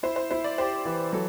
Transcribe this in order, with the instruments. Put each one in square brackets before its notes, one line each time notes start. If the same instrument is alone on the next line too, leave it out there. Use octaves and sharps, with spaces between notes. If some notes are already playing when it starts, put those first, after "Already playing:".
[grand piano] E4 [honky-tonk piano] C5
[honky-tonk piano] C5
[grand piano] E4 [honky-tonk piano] C5
[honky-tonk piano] D5
[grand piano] G4 [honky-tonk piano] C5
[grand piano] E3
[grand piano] F#3 [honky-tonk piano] A4